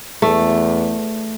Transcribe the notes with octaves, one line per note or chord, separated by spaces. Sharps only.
E2 A3